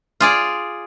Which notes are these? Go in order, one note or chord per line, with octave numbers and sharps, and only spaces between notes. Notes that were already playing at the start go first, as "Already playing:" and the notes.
F4 G#4 D5